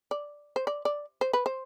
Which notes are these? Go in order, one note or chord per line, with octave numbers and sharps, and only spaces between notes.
D5
C5
D5
D5
C5
B4
C5